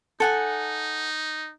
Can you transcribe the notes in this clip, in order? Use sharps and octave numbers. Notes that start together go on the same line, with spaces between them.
D#4 A4 F#5 G#5